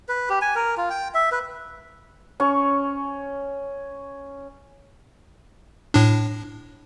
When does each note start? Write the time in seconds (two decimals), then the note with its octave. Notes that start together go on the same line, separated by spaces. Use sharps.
0.09 B4
0.29 G4
0.41 G#5
0.55 A#4
0.77 F4
0.90 G5
1.14 E5
1.32 B4
2.40 C#4 C#6
5.94 A2 D4